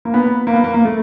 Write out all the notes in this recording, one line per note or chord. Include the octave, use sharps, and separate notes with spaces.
A#3
B3
A#3
B3
A#3
A#3
A3